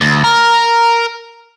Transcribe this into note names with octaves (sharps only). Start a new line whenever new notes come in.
D2
A#4